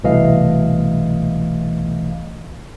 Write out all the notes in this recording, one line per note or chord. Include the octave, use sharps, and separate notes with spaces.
C2 B2 E3 A3 D#5 F5